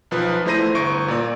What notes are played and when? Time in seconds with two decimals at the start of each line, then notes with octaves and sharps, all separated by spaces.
0.11 B1 F3 B4
0.45 E2 A3 E4 C5 A#6 D#7
0.75 G1 C#6 D7
1.08 A#2 D5